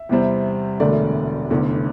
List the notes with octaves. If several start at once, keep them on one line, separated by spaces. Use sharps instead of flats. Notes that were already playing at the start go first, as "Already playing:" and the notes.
Already playing: E5
E2 C3 G3 C4
E1 D2 D3 A3 D5
F1 E2 D3